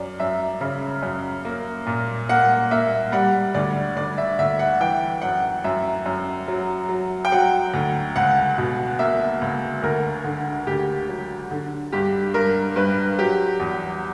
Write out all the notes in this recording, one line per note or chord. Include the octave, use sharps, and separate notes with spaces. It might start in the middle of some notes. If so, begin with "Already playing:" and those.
Already playing: F#2 D5
F#2 E5
C#3
F#2
A#3
A#2
A#3 F#5
A#3 E5
G3 F#5
D2 D5
D2 D5
E5
D2 E5
F#5
E3 G5
F#2 F#5
F#2 E5
F#2
F#3
F#3
G5
F#3 F#5
D2
C#2 F#5
B2
A#3 E5
C#2
D2 A#4
D3
D2 G4
F#3
D3
G2 G4
G2 A#4
G2 B4
F#3 G4
E2